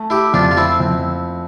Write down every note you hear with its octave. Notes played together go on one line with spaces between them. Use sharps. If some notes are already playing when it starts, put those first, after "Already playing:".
Already playing: A3
E4 G4
F2 D4 F4
F4
C4 E4
F2